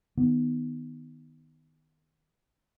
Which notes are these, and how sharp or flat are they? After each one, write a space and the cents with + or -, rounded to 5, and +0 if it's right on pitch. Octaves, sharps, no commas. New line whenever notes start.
D#3 +0 B3 +0